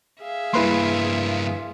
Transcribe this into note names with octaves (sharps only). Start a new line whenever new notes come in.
G#4 E5 F5
G2 A#3 E4 B4 C6